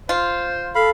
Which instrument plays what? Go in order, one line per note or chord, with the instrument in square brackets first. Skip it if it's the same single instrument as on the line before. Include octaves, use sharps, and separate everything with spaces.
[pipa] F4 [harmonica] C5
[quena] A4 [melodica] F5 B5